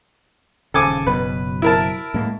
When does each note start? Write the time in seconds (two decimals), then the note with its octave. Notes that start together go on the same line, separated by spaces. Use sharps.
0.74 D#1 C#3 A4 G#5 D6
1.07 F#1 B2 F#3 B4
1.62 E4 A#4 A5
2.14 A2 G#3 A#3